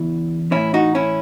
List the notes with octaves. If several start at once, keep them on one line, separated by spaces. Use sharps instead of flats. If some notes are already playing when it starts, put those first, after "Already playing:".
Already playing: E2 C#3 E3 E4
A2 E3 C#4 E4
D#4 F#4
C#4 E4